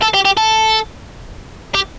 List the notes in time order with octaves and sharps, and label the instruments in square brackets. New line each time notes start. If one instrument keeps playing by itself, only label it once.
[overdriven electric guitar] A4
G4
G4
A4
G4